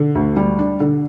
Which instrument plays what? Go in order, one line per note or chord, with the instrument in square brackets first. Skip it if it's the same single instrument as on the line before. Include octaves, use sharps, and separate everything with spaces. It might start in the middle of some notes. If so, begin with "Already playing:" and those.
Already playing: [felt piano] D3
D2
G3
D4
D3